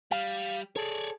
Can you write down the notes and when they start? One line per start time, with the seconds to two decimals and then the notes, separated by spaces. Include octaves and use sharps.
0.11 G3 F5
0.76 G#4 A4 C#5 D5